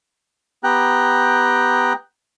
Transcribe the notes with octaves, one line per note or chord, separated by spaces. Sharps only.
B3 G4 G5 A#5 F#6